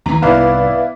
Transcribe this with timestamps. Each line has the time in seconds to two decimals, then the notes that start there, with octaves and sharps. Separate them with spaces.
0.06 D#2 E3 A#5
0.22 C2 G#2 B3 E4 B4 D5 F5